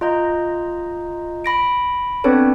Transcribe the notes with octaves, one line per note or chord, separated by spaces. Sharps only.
F4 D#5 A#5 G6
B5 A#6 D7
B3 C4 D4 A4 B4 C#5